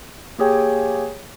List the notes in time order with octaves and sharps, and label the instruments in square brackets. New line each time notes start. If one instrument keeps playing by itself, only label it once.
[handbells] A#3 G4 G#4 C#5 G5 G#5